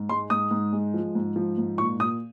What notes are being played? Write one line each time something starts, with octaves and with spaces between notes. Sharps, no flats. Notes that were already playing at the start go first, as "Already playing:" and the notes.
Already playing: G#2
G#3 C6
G#2 D#6
G#2
G#3
F3
G#2
F3
G#2
A#2 C#6
A#2 D#6